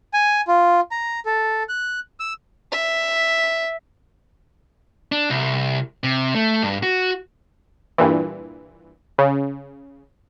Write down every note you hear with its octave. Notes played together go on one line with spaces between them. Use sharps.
G#5
F4
A#5
A4
F#6
E6
E5
D4
C2
C3
A3
G2
F#4
G2 A#2 E3
C#3